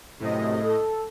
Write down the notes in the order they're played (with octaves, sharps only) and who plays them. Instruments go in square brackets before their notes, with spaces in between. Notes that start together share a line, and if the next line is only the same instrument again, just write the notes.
[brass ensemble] F#2 C3 [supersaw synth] A2 D#5
[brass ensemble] A4